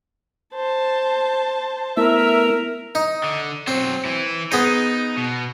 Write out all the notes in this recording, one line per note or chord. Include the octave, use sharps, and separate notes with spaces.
C5 A5
A3 B3 E4 A#4 E5
D#4
D3
F#3 C4 C5
E3 E4
B3 D#4 G#4 C5
B2